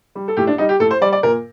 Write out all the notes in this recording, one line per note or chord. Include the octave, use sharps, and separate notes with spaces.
G3
A4
A2 G4
D4
G3 D#4
G4
A2 A4
C5
G3 D5
D5
A#2 A#4